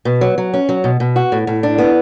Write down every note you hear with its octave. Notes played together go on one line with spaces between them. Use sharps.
B2
F#3
F#3
C#4
F#3
B2
B2
F#4
A2
A2
D4
B3